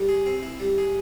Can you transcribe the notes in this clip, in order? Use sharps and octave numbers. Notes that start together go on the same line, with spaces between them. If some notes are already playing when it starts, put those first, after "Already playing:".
Already playing: G3
G#4
C4
E4
G3
G#4